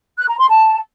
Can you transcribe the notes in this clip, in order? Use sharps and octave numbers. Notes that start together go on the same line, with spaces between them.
F#6
A#5
C6
A5